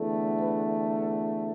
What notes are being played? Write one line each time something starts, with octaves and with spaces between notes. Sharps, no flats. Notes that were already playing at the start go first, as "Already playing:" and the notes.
Already playing: E2 D3 A3
B4
A4